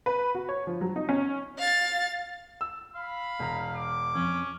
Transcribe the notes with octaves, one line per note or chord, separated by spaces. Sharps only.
B4
F#4
C#5
F3
F#3
D#4
C#4
F5 A6
E6
F5 B5
E1 A#5
D6
F2 C#4